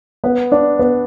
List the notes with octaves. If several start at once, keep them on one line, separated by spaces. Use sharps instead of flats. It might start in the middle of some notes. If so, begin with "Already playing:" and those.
B3 B4
D4 D5
B3 B4